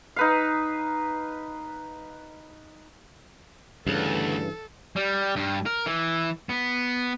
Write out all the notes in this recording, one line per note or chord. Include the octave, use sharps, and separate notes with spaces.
D#4 B4 F5
D2 G2 C#3 E3 A4
G3
G2
A#4
E3
B3